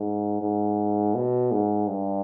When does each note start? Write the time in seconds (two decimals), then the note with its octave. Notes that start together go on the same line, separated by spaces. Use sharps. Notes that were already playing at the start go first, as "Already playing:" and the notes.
Already playing: G#2
0.41 G#2
1.14 B2
1.52 G#2
1.87 G2